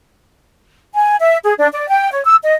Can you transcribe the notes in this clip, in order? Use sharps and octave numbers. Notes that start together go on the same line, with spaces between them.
G#5
E5
G#4
D4
D5
G5
C#5
E6
D#5